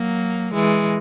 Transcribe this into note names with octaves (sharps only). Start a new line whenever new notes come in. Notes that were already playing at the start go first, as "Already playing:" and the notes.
Already playing: F#3 A#3
E3 G#3